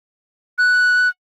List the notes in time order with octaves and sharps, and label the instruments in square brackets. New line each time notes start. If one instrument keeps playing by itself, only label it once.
[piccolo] F#6